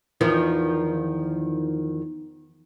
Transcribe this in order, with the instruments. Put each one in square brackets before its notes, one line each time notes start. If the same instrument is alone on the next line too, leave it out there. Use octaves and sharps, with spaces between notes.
[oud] E2 D#3 F3